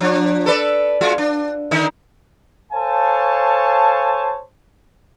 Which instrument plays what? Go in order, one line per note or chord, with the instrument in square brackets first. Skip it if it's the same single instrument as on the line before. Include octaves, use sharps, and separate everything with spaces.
[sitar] F3 D4
A4 B4 D5
G#3 F4 F#4
D4
D3 D#3 D#4
[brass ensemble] A4 C5 C#5 F5 G#5 A5